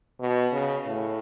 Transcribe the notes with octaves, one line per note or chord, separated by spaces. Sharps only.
B2
C#3
A2